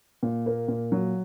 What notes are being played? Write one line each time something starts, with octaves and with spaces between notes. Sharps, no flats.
A#2
A#3
A#2
F#3